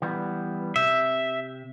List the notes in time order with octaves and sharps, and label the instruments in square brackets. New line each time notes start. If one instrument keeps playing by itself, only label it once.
[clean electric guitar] E3 G3 B3
[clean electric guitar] C3 [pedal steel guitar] E5